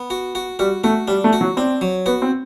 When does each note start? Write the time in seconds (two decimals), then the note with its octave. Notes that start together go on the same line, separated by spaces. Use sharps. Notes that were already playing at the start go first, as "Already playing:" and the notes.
Already playing: B3
0.10 F#4
0.35 F#4
0.59 G3 F#4
0.84 A3 F#4
1.08 G3 D4
1.24 A3
1.33 F#4
1.41 F#3
1.57 C4 D4
1.81 F#3
2.06 B3 F#4
2.22 C4